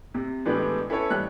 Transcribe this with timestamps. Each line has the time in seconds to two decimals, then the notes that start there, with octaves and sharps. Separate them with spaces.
0.14 C3
0.45 A2 E3 G#3 B3 D4 G4
0.89 C#4 E4 A4 B4 C#5
1.10 A1 G3 F#6